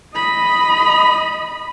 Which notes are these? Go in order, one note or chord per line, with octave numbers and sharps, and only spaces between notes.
D#5 B5